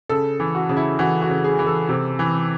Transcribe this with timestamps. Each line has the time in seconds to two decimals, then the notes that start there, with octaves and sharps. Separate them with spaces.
0.09 C#3 A4
0.40 E3
0.55 F#4
0.69 C#3
0.77 E4
0.99 E3 F#4
1.22 F#4
1.29 C#3
1.44 G#4
1.59 E3
1.66 A4
1.89 C3
2.19 E3